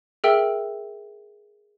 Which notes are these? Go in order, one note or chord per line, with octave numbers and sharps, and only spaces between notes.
G#4 A#4 E5 G5 E6